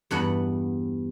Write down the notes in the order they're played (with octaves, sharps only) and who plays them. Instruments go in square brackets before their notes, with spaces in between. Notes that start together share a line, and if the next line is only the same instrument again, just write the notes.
[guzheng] E2 G2 B4 F#5